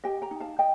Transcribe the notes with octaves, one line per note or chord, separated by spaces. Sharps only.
G4 D#5 G5
G5 A#5
D#4
F5 A5
D#5 G5